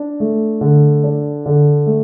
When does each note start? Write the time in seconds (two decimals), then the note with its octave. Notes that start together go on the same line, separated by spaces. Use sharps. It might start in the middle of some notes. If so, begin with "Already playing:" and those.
Already playing: D4
0.20 A3
0.61 D3
1.04 D4
1.46 D3
1.86 A3